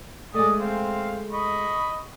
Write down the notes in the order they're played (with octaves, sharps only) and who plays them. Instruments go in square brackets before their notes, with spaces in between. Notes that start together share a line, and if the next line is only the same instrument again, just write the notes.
[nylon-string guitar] G#3 A3 [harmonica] D5 D#5 D#6
[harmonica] C4 F5
D#5 B5 C#6